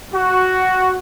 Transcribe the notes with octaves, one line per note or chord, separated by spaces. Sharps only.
F#4